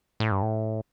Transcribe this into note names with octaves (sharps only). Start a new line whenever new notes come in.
A2
G2
A2